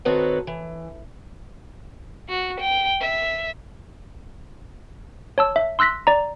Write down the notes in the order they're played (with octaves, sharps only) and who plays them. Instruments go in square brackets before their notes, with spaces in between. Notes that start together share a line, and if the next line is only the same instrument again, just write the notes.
[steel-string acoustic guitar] D#3 C4 F#4 A4 B4 C#5
E3
[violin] F#4
G5
E5
[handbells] C#5 A5 E6
E5
C6 E6 F#6 A#6 B6
D5 A#5